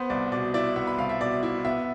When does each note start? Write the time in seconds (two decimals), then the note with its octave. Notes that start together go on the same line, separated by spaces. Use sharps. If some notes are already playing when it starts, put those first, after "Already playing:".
Already playing: B3 C5
0.10 C2 D5
0.32 B2 D5
0.54 E4 D5
0.76 B3 E5
0.87 B5
0.98 C2 F5
1.09 E5
1.21 B2 D5
1.43 E4
1.65 B3 E5